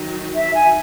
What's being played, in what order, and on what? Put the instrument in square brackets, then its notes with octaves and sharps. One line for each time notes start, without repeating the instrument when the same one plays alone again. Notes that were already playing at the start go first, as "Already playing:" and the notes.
Already playing: [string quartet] D#3 F#3
[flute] E5
G#5